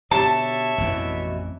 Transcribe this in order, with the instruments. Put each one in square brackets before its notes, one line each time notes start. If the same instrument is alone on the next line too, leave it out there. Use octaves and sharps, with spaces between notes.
[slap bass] B2 D3 [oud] B3 G4 [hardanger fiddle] C#5 E5 [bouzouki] A5
[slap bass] A1 F2 C4 [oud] B2 E3